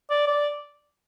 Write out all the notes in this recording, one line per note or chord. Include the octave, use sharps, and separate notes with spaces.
D5
D5